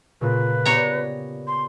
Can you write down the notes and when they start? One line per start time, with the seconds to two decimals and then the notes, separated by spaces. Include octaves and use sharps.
0.21 A#2 C#3 B4
0.65 B3 G4 C#5 D5 A#5
1.47 C6